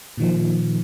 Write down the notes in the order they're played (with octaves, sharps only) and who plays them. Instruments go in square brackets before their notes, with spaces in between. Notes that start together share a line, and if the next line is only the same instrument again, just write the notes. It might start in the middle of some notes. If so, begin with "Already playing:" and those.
[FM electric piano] A#2 D#3 F3